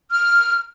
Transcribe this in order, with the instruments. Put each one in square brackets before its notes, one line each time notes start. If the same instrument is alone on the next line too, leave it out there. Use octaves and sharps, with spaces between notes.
[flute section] F6